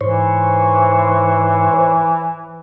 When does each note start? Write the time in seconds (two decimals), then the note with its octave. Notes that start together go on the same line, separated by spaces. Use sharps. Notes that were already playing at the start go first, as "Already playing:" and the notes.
0.01 G#2 E3 C5 C#5